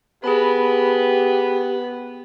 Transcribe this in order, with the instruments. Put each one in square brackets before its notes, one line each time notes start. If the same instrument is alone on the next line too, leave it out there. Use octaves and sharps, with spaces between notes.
[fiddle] B3 [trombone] G4 [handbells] G#4 A5 B5